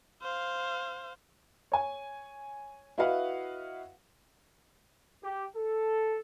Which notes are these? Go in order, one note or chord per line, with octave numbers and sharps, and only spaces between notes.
C5 F5
C#5 G#5
E4 F#4 B4 D#5 F5 F#5
G4
A4